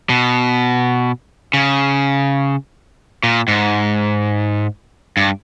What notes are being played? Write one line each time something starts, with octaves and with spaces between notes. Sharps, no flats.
B2
C#3
A#2
G#2
G2